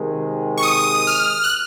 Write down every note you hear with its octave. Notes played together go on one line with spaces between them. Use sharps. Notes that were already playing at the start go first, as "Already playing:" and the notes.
Already playing: C3 D#3 G#3
C#6
D#6
F6
F#6